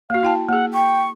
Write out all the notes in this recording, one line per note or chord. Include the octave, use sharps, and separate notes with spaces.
A#3 F#4 F5
E4 G5 A5
A#3 G#4 F#5
G5 C#6